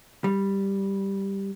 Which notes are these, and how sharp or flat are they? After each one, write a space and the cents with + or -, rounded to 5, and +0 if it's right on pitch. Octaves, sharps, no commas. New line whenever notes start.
G3 +0